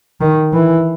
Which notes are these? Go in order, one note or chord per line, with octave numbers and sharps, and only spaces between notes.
D#3
E3